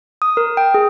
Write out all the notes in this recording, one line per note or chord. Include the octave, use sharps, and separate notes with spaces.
D#6
A#4
G5
G#4